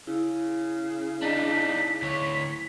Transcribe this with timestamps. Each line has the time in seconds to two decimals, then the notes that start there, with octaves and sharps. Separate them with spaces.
0.07 C#3 E4
1.22 D4 D#4 B6
2.02 D2 C#5